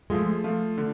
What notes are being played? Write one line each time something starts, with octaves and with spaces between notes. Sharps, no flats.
F3 G#3 A3 F4
F3 A3 F4
D3